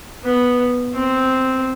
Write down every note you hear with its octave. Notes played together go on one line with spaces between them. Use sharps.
B3
C4